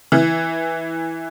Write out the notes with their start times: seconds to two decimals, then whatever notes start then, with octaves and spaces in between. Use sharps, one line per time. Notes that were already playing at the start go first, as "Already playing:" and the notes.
0.12 E3